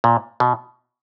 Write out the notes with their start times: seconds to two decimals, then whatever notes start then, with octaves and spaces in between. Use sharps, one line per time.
0.04 A#2
0.40 B2